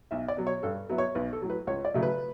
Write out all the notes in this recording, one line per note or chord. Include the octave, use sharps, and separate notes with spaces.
B1 E5
D5
B2 F#3
C#5
G2 A4
F#3 B3 E4
C#5
B1 B4
A4
A2 F#3
B4
C#2 C#5
D5
C#3 F#3 A3 E4
B4